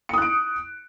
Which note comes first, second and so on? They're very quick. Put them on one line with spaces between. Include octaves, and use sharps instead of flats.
C#7 D#6 F#6 D7